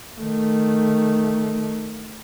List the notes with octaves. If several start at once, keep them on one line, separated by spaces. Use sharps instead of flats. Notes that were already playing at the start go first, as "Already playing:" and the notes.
D#3 A3